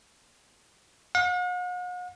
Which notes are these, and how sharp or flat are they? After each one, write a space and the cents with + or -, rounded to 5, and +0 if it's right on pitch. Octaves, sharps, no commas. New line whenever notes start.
F#5 -45